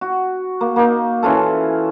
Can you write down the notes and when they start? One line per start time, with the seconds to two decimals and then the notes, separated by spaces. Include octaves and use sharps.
0.01 F#4
0.61 A#3
0.76 A#3 D#4
1.23 E3 C#4 F4 A4